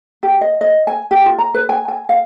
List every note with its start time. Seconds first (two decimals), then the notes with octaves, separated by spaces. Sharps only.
0.23 G4
0.41 D#5
0.61 D#5
0.87 G#5
1.11 G4
1.26 F4
1.38 A#5
1.54 B4
1.69 G#5
1.88 G#5
2.09 F5